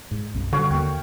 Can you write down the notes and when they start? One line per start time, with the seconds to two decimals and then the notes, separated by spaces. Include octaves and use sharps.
0.11 G#2
0.34 B1 F#2
0.53 G2 D3 F#4 C#5 F5
0.71 D#2 G3 A#3 G5